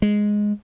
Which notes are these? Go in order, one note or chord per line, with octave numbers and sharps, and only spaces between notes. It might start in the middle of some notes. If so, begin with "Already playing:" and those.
G#3